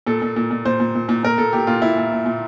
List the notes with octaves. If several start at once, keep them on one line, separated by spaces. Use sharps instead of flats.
A#2 A4
A#2
A#2
A#2
A#2 C5
A#2
A#2
A#2
A#2 A#4
A#2 A4
A#2 G4
A#2 F4
A#2 E4
A#2
A#2
A#2